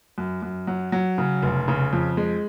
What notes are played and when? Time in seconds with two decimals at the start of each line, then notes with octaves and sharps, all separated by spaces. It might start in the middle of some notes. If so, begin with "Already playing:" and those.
0.18 F#2
0.42 F#2
0.67 F#3
0.92 F#3
1.18 C#3
1.42 F1
1.68 C#3
1.93 F2
2.17 G#3